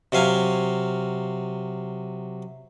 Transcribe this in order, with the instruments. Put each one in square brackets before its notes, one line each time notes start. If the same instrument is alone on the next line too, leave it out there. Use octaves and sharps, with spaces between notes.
[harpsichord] C3 F#3 F5 G#5